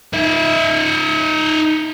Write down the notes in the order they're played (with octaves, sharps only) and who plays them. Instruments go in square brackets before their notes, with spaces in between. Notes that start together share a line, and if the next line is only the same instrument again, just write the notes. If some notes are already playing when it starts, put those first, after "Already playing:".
[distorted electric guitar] D#4 E5